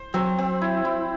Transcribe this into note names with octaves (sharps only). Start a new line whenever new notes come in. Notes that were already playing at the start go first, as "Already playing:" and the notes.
Already playing: C5
F#3 C4
C4
E4
E4